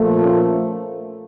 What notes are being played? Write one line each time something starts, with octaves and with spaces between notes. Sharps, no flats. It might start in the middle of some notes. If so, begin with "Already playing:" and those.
Already playing: A#2 F3 A3
C#4